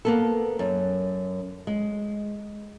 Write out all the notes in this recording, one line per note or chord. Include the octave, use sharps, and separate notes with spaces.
A#3 B3 A4
F#2
G#3